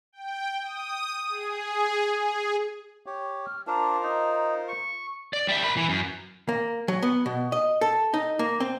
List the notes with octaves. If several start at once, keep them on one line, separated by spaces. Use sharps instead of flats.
G5
D#6
G#4
G#4
G4 C#5
F6
D4 F4 A#4 C5 A#5
D#4
C#6
D5
G3 E5
A#4 B5
E3
F#2
A#3
F#3
B3
B2
D#5
A4
D#4
A#3
C4